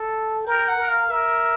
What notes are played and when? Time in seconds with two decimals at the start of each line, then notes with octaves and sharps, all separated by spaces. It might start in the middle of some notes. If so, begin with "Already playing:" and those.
Already playing: A4
0.47 A#4 G5
0.68 F#5
0.78 A#4
0.90 F5
1.10 A#4 E5